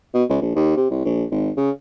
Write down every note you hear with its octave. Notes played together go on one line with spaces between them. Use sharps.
B2
C#2
A#1
D#2
C3
C2
A#1
G#1
C#3